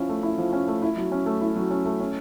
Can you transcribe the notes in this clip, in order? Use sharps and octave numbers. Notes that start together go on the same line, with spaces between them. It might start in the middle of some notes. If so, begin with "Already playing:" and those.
Already playing: F3 C#4 E4
A3
E4
F3
C#4
A3
E4
F#3
C#4
A3
E4
F#3
C#4
A3
C#4